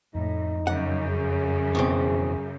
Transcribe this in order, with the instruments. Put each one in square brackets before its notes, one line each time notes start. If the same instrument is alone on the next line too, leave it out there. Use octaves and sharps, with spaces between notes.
[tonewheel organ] F2 [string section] A2 [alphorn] D#4
[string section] F#2 C#3 [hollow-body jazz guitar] F#5
[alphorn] G#4
[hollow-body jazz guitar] E2 B2 C4